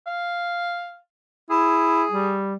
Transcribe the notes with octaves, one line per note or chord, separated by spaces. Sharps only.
F5
E4 G#4
G3